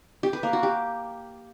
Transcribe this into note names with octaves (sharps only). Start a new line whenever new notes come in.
G4
B4
A#3
F#4
G4